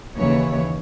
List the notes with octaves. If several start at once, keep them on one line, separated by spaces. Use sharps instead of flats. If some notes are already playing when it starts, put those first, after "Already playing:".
D#2 C#3 E3 C#5